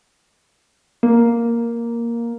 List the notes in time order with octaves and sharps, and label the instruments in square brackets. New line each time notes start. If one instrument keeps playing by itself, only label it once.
[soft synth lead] A#3